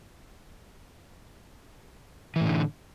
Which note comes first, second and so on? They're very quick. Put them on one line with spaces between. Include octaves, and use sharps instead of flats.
E3 A2 D3